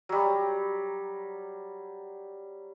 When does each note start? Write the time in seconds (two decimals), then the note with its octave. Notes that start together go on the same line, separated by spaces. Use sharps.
0.09 F#3 G3